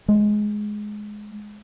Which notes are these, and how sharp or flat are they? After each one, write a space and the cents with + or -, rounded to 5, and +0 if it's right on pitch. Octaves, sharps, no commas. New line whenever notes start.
G#3 +10